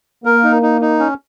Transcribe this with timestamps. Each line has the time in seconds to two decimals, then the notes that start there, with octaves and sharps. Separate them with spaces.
0.25 A#3 A#4
0.44 D#4
0.62 D#4
0.81 D#4
0.99 C#4